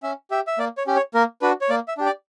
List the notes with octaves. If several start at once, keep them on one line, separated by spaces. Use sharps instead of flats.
C#4 E5
G4 E5
E5
A#3 D5
C#5
C#4 G4
C#5
A#3 A#4
D4 F#4 B4
C#5
A#3 D5
E5
D4 G4
D5